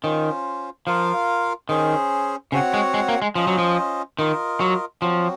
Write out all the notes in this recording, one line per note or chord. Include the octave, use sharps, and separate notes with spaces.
D#3 C#4 F4 C5
F3 F4 A#4 F5
D#3 C#4 G#4 C5
C#3 C4 F#4 C#5 F#5
G#3
G#3
A#3
G#3
F3 C#4 F4 C5 D#5
F#3
F3
D#3 F4 A#4 D#5
F#3
F3 F#3 C4 F#4